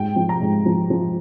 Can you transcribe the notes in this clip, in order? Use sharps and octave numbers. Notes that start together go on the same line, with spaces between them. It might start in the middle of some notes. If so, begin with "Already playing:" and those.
Already playing: G#2 G5
F3
A#5
G#2
F3
F3